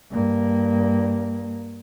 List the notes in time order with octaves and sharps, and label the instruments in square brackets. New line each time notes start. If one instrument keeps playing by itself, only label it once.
[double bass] G2 A#3